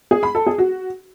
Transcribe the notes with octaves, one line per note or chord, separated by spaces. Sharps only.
G#4
B5
A4
G#4
F#4